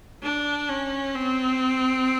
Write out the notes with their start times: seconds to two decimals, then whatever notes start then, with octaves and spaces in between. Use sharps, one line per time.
0.23 D4
0.69 C#4
1.15 C4